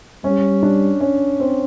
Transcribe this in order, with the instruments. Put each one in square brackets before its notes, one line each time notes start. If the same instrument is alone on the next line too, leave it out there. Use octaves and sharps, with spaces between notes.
[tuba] G3 [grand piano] C#4
[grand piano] D4
C#4
C4